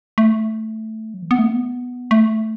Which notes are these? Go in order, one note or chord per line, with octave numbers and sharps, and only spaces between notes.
A3
F#3
E3
B3
A3
B3
A3